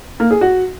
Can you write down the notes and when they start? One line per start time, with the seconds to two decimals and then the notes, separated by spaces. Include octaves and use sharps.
0.20 A#3
0.31 G#4
0.41 F#4